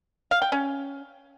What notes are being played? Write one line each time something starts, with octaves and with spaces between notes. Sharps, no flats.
F5
G5
C#4